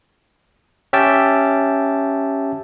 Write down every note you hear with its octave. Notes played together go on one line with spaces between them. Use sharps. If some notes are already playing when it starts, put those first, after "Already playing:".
C#4 G4 E5 G5 A5